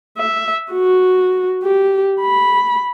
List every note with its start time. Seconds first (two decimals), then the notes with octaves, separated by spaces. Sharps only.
0.18 E5
0.72 F#4
1.64 G4
2.20 B5